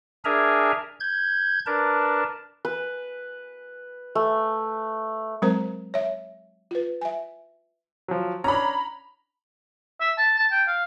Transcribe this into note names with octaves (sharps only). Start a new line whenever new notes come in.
D4 G#4 A#4 E5 G#5 A#5
G6 G#6
D4 A#4 B4 A5
B4
A3
F#3 G#3 C4 A#4 C5 A#5
C#5 E5
F4 B4
E5 G#5
F3 F#3
C#4 D4 C#5 A#5 B5
E5
A5
A5
G5
F5